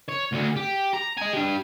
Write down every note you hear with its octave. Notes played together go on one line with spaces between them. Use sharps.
C#5
D2 D3
G4
A#5
D#5 G#5
D4 G4